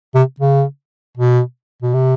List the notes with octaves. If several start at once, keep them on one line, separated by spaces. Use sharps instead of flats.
C3
C#3
B2
B2
C3